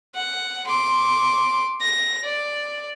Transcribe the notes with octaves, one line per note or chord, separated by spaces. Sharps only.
F#5
C6 D6
A#6
D5